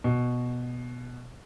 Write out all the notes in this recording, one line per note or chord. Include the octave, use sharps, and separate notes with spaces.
B2